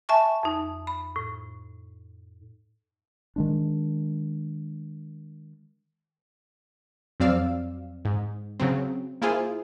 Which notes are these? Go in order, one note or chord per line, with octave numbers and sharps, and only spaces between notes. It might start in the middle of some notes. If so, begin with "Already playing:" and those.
E5 G#5 A5 C#6
F2 D#4
B5
A2
D#3 G#3 D4
F2 F#3 C4 D5 F5 E6
G#2
C#3 F#3 C4
A#3 E4 F4 G#4 C5 G#5